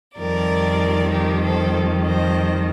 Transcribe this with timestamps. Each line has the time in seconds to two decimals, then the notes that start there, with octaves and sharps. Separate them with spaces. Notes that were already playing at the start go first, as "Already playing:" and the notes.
0.17 F2 D#3 G3 A#4 D5
1.12 G4 A#4
1.44 A4 C5
2.07 C5 D#5